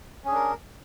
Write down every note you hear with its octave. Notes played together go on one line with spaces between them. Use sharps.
C#4 D4 G#4 A#4